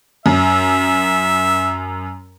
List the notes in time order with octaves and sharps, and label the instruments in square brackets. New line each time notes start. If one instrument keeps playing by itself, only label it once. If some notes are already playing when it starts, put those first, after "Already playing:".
[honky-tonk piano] F#2 [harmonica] E5